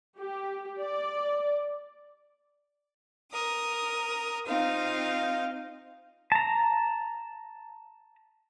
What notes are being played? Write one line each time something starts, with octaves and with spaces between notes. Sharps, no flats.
G4
D5
A#4 D#6
C4 D#4 F4 F5
A5 A#5